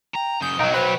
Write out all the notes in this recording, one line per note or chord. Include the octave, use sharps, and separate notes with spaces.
G5 A#5
F#2 C#3 D#6 G6
B1 F#3 D#4 D#5 G5
B4 C5